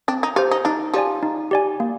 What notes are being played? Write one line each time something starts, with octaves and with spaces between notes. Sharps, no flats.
C4 D4
D#4
F4 G4 C5
D#4
D4 D#4
F3 G4 D5 G#5
D#4
G4 D5 G#5
A#3